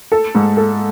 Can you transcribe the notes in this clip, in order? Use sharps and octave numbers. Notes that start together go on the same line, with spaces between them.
A4
G#2
A4